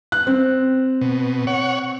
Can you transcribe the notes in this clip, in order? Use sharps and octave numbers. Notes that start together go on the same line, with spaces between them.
F#6
C4
B2
C#5 F#5